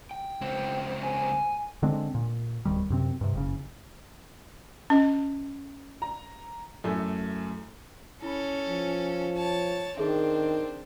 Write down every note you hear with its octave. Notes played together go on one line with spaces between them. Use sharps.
G5
C#2 C4
G#5
D3 G#3 C4 D4
A#2
D1 C2 D#3 G3
F#2 C3 C4
G2 C3
F#1 C#3
C#4 D#5
A#5
F#2 A3 E4
C#4 E4 A4 B5
F3
C#5 A5
D#3 C4 D4 G#4 A4 E5